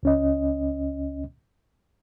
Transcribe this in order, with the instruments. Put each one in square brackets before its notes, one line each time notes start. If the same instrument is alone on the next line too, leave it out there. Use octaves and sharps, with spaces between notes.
[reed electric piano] C#2 C#4 D#5